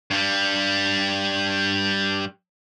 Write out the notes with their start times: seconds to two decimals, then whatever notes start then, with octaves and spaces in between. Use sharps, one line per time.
0.11 G2 G3